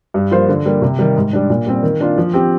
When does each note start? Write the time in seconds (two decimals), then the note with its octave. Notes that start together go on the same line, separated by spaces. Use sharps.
0.14 G2
0.31 F3 A#3 F4 C5
0.49 D3
0.66 G3 A#3
0.82 C3
0.99 D#3 G3
1.16 G#2
1.33 G3 D4
1.50 A#2
1.67 G3 C4
1.83 D#3
2.00 A#3 D4 F4
2.18 F3
2.33 C4 G4